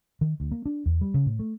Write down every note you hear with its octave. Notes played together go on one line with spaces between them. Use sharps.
D#3
D2
A#3
D4
E2
G3
C#3
A2
A3